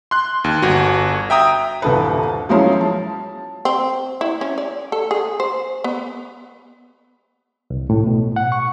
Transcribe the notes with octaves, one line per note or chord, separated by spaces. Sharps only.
C6 F#6
D#2
G1 F#4
E5 G5 A#5 D#6
D#1 C2 G2 A4 B4
F3 F#3 G#3 A#3 C#4 E4
A5
C4
E4
C#4
D5
A4
G#4
C5
B3
C2
A2
B2
F#5
C#6